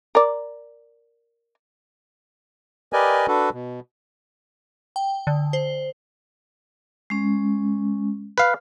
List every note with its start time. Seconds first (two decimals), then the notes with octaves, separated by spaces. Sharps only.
0.15 A#4 D5
2.93 G4 A#4 B4 D5 D#5 G#5
3.28 D4 F#4 A4 B4
3.53 B2
4.96 G5
5.27 D3
5.53 C5
7.10 G#3 C#4
8.38 B4 F5